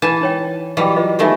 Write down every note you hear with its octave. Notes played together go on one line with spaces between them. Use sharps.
E3 G#5 A5
D#4 C#5 G5
E3 F#3 G3 D#5 G5
F4 B4 D#5
D#3 A3 B3 G4 E5 G#5